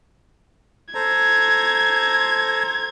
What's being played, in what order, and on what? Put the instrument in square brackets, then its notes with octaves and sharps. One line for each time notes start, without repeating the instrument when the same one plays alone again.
[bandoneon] A4 C5 A#5 [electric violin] G#6